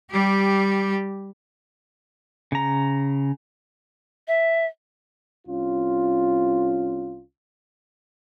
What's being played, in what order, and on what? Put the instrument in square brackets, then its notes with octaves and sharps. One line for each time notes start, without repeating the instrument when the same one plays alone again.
[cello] G3 G4
[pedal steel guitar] C#3 A#5
[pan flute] E5
[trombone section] C2 C#4 F4